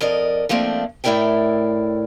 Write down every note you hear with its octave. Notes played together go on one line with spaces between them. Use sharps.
F2 A#4 D5 D#5
F3 A3 A#3 C4 D4
A2 A3 E4 A#4 D5 G5